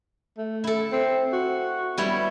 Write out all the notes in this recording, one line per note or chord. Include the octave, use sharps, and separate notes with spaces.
A3
E4 A4
C4
F#4
G3 B3 E4 C#5